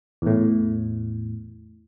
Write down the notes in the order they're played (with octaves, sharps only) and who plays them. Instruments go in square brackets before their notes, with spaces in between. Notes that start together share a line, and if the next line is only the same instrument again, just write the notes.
[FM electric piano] E2 A2